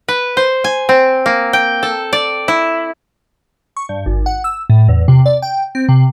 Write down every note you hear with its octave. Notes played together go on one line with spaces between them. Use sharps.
B4
C5
G#5
C4
A#3
G5
A4
D5
E4
C#6
G2
G#1
F#5
E6
A2
E2
C3
D5
G5
C4
C3